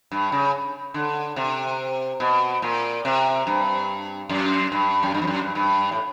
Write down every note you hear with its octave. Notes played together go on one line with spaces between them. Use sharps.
G2
C#3
D3
C3
B2
A#2
C3
G2
F#2
G2
F#2
G2
F2
F#2
G2
G2
A2